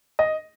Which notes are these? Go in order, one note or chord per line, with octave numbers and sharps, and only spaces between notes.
D#5